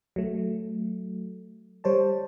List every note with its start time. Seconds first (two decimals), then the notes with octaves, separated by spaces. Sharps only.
0.16 F#3 A3
1.84 G3 C5 C#5 A5